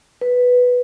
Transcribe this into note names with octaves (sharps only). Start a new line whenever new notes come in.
B4